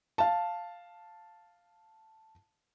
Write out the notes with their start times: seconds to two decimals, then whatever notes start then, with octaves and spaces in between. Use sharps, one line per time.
0.18 F5 A5